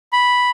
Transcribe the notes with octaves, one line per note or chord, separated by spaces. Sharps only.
B5